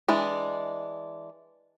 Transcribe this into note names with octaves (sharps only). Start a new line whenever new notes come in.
E3 G#3 D4